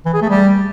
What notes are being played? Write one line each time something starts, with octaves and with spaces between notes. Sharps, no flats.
E3
G#4
A3
G3